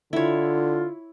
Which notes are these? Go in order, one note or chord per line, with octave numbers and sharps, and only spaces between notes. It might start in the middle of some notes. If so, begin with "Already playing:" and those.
D3 E4 F4 C#5